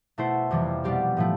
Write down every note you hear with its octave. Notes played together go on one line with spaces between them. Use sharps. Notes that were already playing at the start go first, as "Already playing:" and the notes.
B2 A3 E4 A4 C5
F2 C3 E3 G3
B2 G3 C4 G4 D5
A2 F3 A3 E4